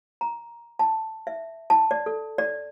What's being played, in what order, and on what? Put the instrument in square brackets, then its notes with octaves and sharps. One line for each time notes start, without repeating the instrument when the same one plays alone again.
[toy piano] A#5
A5
E5
A5
D5
A4
D5